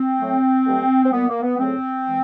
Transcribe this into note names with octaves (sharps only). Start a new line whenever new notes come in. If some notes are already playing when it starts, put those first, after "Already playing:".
Already playing: C4
A2 F#3 A3
G2 D3 F#3 A3
C4
A#2 G3 A#3 B3
A#3
B3
F2 C#3 F#3 A3 C4
E3 G#3